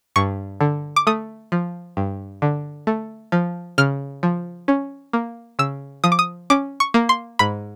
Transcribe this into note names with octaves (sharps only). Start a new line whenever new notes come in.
G2 C#6
D3
D6
A3 D#6
F3
G2
D3
A3
F3
C#3 F6
F3
C#4
A#3
C#3 E6
F3 D#6
D6
D#6
C#4 D6
C#6
A#3
C6
G#2 B5